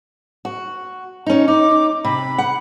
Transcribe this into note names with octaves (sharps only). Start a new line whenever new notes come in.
F#4
C#4 D#4
D#4 D6
C3 B5
F#5